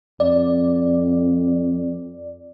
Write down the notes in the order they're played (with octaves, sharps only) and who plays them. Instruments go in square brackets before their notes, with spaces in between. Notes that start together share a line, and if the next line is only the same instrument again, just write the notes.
[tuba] F2 [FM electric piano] D5